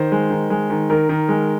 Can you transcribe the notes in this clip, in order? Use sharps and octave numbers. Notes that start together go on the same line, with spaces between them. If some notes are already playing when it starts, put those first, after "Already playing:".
Already playing: D#3 C5
G#3
D#3
G#3
D#3
D#3 A#4
D#3
G#3